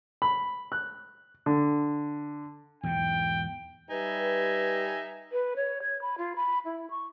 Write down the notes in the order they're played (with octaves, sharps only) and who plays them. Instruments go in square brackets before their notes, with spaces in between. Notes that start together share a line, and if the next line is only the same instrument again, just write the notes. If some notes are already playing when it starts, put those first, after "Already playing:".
[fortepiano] B5
F#6
D3
[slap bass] E2 G#2 B2 [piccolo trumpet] G5
[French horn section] G3 G4 B4 [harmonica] D#4 E5 G#5
[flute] B4
C#5
G#6
B5
F4
B5
E4
C#6